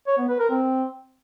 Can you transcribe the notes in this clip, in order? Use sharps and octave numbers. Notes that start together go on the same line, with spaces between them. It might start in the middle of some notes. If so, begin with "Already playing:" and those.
C#5
B3
B4
A#4
C4